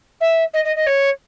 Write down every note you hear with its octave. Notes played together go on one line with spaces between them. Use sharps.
E5
D#5
D#5
D#5
C#5